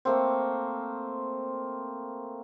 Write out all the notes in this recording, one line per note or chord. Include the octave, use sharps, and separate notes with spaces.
A3 A#3 C4